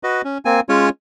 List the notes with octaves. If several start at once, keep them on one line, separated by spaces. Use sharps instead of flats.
F#4 B4 D#5
C#4
A#3 C4 G#5
G#3 C#4 F4 C#5